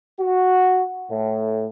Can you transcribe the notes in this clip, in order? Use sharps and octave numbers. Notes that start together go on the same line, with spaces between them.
F#4
A2